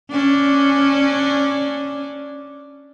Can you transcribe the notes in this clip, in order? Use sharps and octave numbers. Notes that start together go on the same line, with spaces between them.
C#4 D4